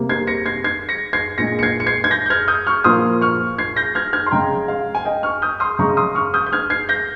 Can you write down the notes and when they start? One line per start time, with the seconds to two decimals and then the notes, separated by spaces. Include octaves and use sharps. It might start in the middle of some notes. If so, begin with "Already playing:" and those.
Already playing: C3 G3 A#3
0.09 G#6 C7
0.27 A#6 C#7
0.46 G#6 C7
0.64 G#6 C7
0.89 A#6 C#7
1.13 G#6 C7
1.38 A#2 G#3 A#6 C#7
1.59 C#7
1.63 G#6 C7
1.80 C#7
1.87 G#6 C7
2.04 G#6
2.11 G6 A#6
2.26 G6
2.30 F6 G#6
2.48 D#6 G6
2.67 C#6 F6
2.84 A#2 F3 A#3 C6 D#6
3.21 C#6 F6
3.58 G#6 C7
3.76 G6 A#6
3.95 F6 G#6
4.13 F6 G#6
4.26 C6
4.31 C#3 G#3 G5 A#5
4.68 F5
4.95 G#5
5.05 D#5 G5
5.23 C#6 F6
5.42 D#6 G6
5.60 C6 D#6
5.79 C#3 G#3 A#5 C#6
5.97 C6 D#6
6.15 C#6 F6
6.34 D#6 G6
6.46 G6
6.52 F6 G#6
6.70 G#6 C7
6.89 G6 A#6